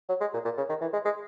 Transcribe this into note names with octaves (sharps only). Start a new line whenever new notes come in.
F#3
G#3
A#2
A#2
C#3
D#3
E3
G#3
G#3